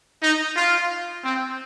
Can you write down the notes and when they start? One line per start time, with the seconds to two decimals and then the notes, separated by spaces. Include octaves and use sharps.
0.22 D#4
0.56 F4
1.24 C4